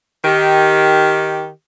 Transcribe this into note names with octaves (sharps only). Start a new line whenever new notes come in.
D#3 G4